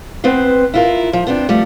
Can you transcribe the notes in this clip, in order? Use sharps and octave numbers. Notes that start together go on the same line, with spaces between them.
B3 C4 B4 C5
E4 F4 A#4
F3
B3 C4 D4
F3 G3 A3